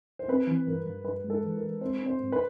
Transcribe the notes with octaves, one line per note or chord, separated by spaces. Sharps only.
C5
C4 B4
E3
G2 A#4
G2
G2 B4
G#3
A4
E3
A#4
G#3
C4 C5
C4
C5
G#2
B4